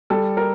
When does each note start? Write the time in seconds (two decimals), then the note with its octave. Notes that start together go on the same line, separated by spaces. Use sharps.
0.10 G3 A4
0.37 A#4